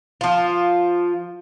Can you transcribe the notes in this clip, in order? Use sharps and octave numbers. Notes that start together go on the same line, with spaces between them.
F3 F4